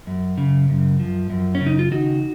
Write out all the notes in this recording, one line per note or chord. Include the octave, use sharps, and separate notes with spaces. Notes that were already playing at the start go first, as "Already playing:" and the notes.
F#2
C#3
F#2
F3
F#2
C#4
C#3
D#4
F4
D#3 D#4 F#4